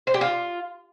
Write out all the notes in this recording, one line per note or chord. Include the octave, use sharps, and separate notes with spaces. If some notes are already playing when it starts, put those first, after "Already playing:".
C5
G4
F4